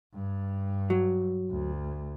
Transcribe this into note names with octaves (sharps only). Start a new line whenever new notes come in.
G2
F#3
D2